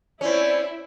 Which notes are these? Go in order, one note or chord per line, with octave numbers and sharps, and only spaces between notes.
C4 C#4 E4 D5